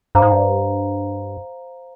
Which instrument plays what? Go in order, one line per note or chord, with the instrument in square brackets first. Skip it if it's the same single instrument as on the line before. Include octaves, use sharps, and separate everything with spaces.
[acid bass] G2 [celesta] C5 F5 A#5
[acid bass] G#2
G2